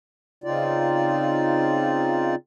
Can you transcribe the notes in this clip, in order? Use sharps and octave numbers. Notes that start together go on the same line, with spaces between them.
C#3 C4 D#4 F4 D5